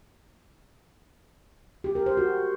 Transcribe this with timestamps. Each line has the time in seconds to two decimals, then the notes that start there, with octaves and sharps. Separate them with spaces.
1.84 G4
1.95 A#4
2.06 C5
2.17 F#4